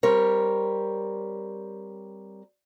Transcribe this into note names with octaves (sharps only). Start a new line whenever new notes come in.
G3 C4 A#4 C#5